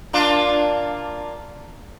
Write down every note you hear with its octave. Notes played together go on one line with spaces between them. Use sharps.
A#3 D4 F4